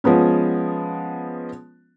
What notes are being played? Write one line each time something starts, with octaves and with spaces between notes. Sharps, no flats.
F3 G#3 B3 C#4